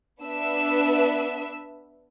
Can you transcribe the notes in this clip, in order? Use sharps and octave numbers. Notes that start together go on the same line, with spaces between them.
B3 D4 B4 E5 E6